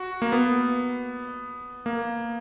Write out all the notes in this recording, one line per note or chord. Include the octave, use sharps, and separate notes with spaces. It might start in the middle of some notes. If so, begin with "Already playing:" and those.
Already playing: F#4
A#3
B3
A#3